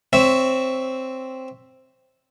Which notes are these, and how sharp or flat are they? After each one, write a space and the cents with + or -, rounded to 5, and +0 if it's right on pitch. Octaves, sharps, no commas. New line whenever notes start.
C4 +0 C#5 +10 E5 +0